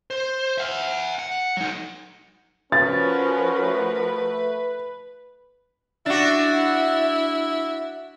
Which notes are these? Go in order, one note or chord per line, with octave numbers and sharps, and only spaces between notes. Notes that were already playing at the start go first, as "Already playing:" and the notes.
C5
E5 F#5
F#5
F#3 D#4
F3 C#4 F#4 A#4 B4 A6
A3
D4 E4 F#4